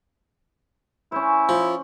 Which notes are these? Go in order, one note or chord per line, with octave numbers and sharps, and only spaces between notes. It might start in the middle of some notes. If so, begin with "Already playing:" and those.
C#4 E4 C5
F3